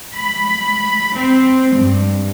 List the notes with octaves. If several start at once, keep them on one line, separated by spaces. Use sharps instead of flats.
B5
C4
G2